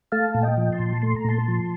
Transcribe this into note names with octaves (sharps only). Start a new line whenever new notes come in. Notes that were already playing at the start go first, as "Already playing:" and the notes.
A3 F5 A5
A#2
D#5 G5
F3
A5 C6
A#2
A3 C6
A#5
A#2 A5 C6
F3